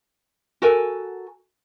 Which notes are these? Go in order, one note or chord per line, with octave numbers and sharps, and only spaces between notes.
F#4 A4 A#4 G#5